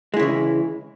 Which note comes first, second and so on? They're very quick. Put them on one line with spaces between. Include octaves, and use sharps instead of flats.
G#3 E4 C#3 E3